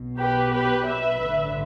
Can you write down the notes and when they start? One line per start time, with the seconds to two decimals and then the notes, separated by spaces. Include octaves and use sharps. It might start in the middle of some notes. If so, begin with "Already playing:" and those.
Already playing: B1 B2
0.19 G4 B4
0.52 G4 B4
0.87 B4 E5
1.21 A1 G2 D3